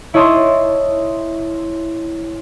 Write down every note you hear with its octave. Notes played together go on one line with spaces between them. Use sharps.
E4 C#5 D#5 A5 C6